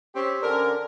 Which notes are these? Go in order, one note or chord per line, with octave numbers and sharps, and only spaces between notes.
C4 C#4 G4
D3 C#4 A#4